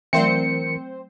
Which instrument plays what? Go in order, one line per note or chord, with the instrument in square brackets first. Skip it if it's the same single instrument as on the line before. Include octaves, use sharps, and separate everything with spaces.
[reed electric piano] E3 A#4 [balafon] F#3 A3 E5 [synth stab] C4 C5 [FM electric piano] C#7